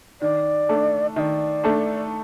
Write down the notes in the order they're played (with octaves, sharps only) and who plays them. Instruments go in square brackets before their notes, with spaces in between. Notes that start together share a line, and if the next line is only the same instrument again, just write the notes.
[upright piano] D#3 [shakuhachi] D5
[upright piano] A3 D4 A4
[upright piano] D#3 [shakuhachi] D5 E5
[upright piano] A3 D4 A4